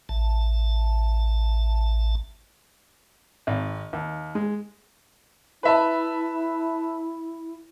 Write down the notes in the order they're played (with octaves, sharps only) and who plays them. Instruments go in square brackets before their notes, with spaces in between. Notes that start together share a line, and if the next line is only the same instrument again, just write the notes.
[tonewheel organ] A1 A5
[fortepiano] G#1
D#2
G#3
[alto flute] E4 [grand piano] B4 E5 A5